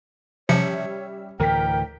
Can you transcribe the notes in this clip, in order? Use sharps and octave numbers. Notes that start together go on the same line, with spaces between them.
C3 F3 G3 C#4 C#5 E5 C#7
D2 A2 E3 A#4 G5 B6